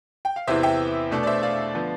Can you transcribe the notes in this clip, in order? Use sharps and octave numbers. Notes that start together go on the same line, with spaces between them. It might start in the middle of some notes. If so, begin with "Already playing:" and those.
G5
F5
E2 C3 E3 B3 C5 E5
E5 G5
B2 A3 D4
D5
C5 E5
D5 F5
D3 F3 B3